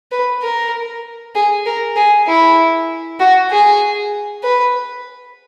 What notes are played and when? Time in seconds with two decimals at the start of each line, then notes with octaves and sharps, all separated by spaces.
0.12 B4
0.42 A#4
1.35 G#4
1.66 A#4
1.96 G#4
2.27 E4
3.20 F#4
3.50 G#4
4.43 B4